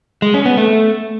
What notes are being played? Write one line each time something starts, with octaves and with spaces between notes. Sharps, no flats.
G#3
C#4
B3
A3